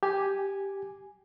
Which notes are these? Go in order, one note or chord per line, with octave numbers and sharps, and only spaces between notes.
G4 G#5